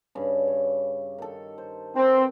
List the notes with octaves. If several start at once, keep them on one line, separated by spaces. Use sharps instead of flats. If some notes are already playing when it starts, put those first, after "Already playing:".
G2 C#3
C#5
D#3 A4
C5
C4 B4